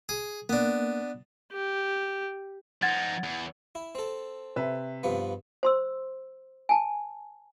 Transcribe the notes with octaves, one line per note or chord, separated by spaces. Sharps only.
G#4
A#3 B3 D4
G4
F3 D#4 F#5 G#6 A6
E2
E4
C4 A4
C3 B4 E5
G2 F3 B3
C5 C6 E6
G#5 A5